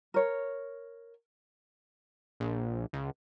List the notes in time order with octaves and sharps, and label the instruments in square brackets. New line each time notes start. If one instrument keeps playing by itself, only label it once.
[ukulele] A#4 C#5
[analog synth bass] A#1
C#2